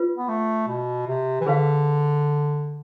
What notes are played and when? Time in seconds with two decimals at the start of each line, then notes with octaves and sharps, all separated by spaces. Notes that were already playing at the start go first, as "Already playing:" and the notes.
Already playing: F4 B4
0.18 B3
0.29 A3
0.68 B2
1.07 C3
1.41 E3
1.46 D3 G#4 B4 F5